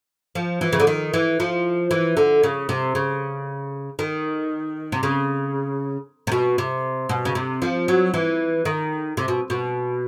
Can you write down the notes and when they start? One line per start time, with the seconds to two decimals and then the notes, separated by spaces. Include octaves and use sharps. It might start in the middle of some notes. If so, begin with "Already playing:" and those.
0.35 F3
0.61 E3
0.73 C#3
0.80 D3
0.87 D#3
1.14 E3
1.40 F3
1.91 E3
2.17 D3
2.43 C#3
2.69 C3
2.95 C#3
3.99 D#3
4.92 C3
5.03 C#3
6.27 C3
6.32 B2
6.58 C3
7.09 B2
7.25 C#3
7.35 C3
7.62 F3
7.88 F#3
8.14 E3
8.65 D#3
9.17 C3
9.28 B2
9.50 B2